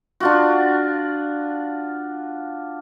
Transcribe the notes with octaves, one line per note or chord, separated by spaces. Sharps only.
D4 F4 F#4